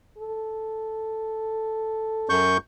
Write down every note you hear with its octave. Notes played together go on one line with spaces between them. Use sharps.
A4
F#2 C#6 G6